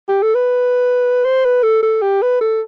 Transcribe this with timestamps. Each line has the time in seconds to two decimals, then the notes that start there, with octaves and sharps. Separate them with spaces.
0.09 G4
0.22 A4
0.35 B4
1.25 C5
1.45 B4
1.63 A4
1.82 A4
2.02 G4
2.22 B4
2.41 A4